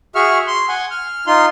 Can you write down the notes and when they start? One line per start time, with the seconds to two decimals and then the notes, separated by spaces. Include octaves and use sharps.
0.15 F#4 G#4 E5 C#6 F6
0.47 C6
0.69 F#5 G#5
0.91 F6
1.27 D#4 F4 C6